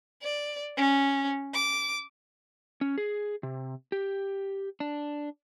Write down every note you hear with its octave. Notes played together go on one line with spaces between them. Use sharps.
D5
C#4
D6
C#4
G#4
C3
G4
D4